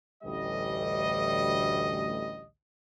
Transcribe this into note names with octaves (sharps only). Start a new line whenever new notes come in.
A1 D2 G3 D#5